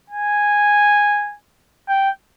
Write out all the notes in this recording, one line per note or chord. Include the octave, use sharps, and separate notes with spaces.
G#5
G5